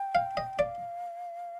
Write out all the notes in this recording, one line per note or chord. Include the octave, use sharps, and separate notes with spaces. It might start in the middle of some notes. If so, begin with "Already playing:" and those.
Already playing: G5
F5
D#5
D5 F5